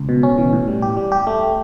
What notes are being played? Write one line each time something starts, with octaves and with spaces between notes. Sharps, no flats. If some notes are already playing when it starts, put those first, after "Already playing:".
Already playing: C#2
B2
C#4
E3
A2
G3
G4
G3
G4
A3